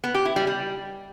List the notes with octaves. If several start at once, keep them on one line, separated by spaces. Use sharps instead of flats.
B3
G4
E4
G3
G3